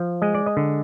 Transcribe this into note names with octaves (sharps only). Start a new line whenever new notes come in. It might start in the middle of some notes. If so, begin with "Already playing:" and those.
Already playing: F3
G#3 D#5
D5
D#5
D3